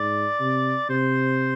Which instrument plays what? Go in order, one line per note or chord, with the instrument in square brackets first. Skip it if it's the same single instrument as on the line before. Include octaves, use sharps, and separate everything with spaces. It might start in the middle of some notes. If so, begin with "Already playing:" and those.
Already playing: [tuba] G#2 [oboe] D5
[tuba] C3
[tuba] C3 [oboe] C5